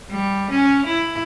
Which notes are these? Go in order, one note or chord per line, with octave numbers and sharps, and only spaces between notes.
G3
C#4
E4